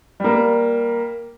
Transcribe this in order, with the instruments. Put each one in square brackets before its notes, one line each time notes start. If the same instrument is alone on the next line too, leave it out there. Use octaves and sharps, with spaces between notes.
[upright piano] G3 A#3